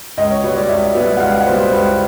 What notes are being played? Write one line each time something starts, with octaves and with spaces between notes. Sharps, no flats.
C#2 D#5
C#5
B2 G3 B3 C#5
D5
C#2 E5
B2 G3 B3 E5
F#5
C#2 F5
F#5
B2 G3 B3 C5
C5
C#2 B4